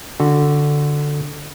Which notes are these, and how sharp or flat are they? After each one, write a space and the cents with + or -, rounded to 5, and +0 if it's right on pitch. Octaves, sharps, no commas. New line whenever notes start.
D3 +0 F#4 -10